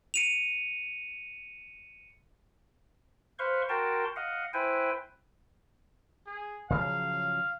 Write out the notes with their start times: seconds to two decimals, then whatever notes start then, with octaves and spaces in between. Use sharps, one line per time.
0.14 C#7 D#7 F7
3.39 B4 C5 F5 C6 C#6
3.69 F#4 A#4 G5 A5 C6
4.16 D#5 F5 F#5
4.54 E4 B4 C5 G5 G#5
6.26 G#4
6.70 C#3 F3 F#3 F5